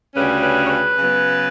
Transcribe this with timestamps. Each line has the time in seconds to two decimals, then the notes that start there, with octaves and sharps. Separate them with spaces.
0.14 D2 C#3 G3 C#4 B4
0.42 B4
0.65 C#5
0.70 B4
0.97 C#3 F#3 B3